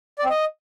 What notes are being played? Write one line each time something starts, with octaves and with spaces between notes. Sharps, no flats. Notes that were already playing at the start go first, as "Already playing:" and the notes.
D5
C4
D#5